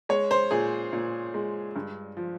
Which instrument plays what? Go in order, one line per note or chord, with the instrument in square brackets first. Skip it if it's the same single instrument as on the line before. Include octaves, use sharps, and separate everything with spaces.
[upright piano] G#3 C#5
C5
A#2 G#4
A#2
G#3
G2
F3